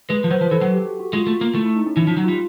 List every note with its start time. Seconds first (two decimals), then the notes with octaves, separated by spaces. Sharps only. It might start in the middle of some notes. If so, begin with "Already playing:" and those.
0.09 G#3 B4
0.24 F3
0.31 F#3 C5
0.41 F3 B4
0.51 E3 A4
0.61 F#3 A4
0.71 G4
0.85 F#4
1.00 F#4
1.13 G#3 F4
1.27 A3
1.41 A#3
1.55 A3 E4
1.65 E4
1.76 D#4
1.86 C#4
1.96 E3 D#4
2.07 F3
2.17 F#3
2.24 G3 F4